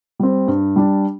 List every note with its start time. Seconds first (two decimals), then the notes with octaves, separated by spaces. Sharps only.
0.19 G3 C4
0.48 G2
0.76 G3 D4